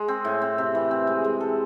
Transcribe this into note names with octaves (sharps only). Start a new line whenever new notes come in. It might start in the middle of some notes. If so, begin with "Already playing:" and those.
Already playing: G#3
C4
A2
C4
C3
E3
C4
G#3
G#3
A4